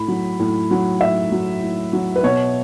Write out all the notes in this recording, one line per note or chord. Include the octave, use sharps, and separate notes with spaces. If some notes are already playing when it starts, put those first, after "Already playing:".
Already playing: A2 B5
F#3
A2
F#3
A2 E5
F#3
A2
F#3
B4
B2 C#5